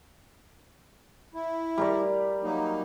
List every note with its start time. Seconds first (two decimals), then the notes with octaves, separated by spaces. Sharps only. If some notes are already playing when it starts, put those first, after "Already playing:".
1.34 E4
1.78 G3 A#4 D5
2.43 F#3 A#3 D#4